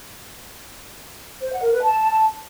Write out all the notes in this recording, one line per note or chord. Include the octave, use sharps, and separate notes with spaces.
C5
F#5
A#4
B4
A5